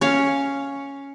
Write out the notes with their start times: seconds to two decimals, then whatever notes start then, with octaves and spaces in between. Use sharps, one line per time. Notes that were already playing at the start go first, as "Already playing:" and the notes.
0.01 C#4 C#5 F5